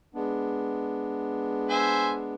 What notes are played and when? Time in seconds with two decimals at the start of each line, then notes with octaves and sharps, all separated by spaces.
0.15 G#3 B3 D4
1.69 C5 E5 G#5